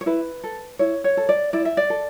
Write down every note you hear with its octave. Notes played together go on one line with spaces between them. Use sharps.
C#5
E4 B4
A4
E4 C#5
C#5
A4
D5
E4 D5
E5
D5
A4